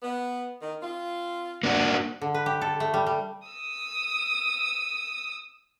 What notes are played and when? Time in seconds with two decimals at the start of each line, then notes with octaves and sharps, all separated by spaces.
0.03 B3
0.61 D#3
0.82 C4 F4
1.63 A#3 D4 F#4
2.21 D3
2.34 B4
2.46 G4
2.61 A4
2.80 A3
2.94 G3
3.06 G3
3.48 D#6 E6